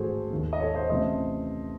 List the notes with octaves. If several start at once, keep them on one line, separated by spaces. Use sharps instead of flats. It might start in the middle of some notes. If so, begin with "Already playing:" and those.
Already playing: A1 G#2 D#3 F#4 G#4 A4 C5
D#2 D#3 G#3
D#5
A4 C#5
C5 D#5
C3 E3 A3 C#4 C5 D#5